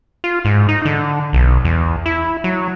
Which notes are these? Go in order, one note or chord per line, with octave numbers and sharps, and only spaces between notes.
F4
G#2
D#4
D3
B1
E2
E4
F#3